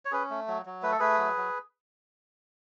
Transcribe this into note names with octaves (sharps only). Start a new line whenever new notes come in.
C#5
C#4 G#4 B4
A3
F#3
F#3
A3 B4
A4
A3 G#4 B4
F#3
F#3